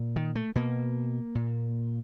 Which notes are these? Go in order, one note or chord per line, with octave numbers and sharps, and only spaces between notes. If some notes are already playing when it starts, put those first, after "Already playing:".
Already playing: A#2
D#3
A3
B2 A#3
A#2